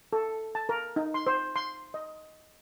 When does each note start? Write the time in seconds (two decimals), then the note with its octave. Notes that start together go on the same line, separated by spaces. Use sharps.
0.13 A4
0.55 A5
0.69 A#4
0.96 D#4
1.14 C6
1.27 C5
1.56 C6
1.94 D#5